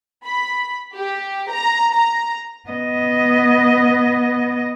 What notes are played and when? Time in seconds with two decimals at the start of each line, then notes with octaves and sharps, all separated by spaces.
0.25 B5
0.95 G4
1.51 A#5
1.94 A#5
2.70 B3 D#5